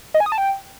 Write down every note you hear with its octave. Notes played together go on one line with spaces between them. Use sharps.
D#5
G#5
D#6
A5
G5